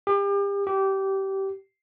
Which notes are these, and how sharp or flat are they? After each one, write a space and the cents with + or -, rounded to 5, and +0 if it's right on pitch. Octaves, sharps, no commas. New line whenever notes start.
G4 +35
G4 -20